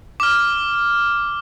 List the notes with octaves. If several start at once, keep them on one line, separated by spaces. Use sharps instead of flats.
D6 F6